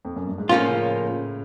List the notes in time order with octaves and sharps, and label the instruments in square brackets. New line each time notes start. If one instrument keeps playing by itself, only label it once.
[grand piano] F2
F#2
G2
G#2
[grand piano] A2 [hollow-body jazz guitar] F3 A#3 C#4 F4
[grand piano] C#3